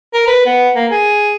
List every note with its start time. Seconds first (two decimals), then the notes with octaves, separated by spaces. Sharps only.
0.14 A#4
0.27 B4
0.46 B3
0.76 A#3
0.91 G#4